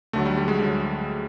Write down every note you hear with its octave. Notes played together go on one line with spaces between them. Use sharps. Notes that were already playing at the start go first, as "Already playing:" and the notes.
D2 D3 F#3 A3
G3
G3
G#3
D2 D3 F#3